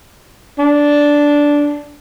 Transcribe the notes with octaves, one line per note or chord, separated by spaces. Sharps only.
D4